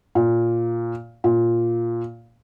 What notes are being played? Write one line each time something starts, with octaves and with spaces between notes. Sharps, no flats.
A#2
A#2